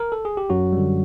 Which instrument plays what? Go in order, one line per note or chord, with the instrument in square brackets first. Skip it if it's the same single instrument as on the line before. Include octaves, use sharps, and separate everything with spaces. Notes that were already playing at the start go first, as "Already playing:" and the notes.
[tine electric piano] A#4
A4
G#4
G4
F#2 F#3 F#4
D3 G3